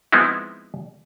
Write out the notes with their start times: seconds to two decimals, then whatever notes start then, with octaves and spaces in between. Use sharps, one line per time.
0.12 F3 G#3 B3 C4 D#4 E4